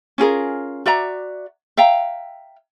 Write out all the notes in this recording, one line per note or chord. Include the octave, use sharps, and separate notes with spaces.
C#4 F4 G#4 A#4
F#4 D5 E5 A#5
E5 F5 G5 A#5